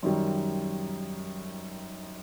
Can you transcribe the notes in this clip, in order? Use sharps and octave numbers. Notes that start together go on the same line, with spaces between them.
F#2 D#3 G3